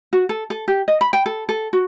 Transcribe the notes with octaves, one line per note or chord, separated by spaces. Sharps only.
F#4
A4
A4
G4
D#5
B5
G5
A4
A4
F#4